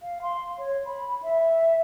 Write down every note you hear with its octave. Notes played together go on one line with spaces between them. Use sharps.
F5
C6
C#5
B5
E5